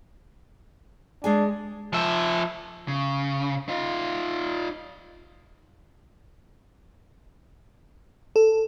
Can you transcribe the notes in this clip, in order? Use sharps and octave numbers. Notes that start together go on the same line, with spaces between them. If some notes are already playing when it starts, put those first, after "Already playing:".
G#3 D4 G#4 G#5
F3 E5
C#3
D#4 F4
A4